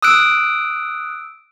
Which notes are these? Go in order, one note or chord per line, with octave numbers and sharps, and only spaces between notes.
D#6 E6 F#6 D7